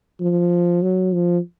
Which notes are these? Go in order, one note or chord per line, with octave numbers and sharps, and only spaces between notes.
F3
F#3
F3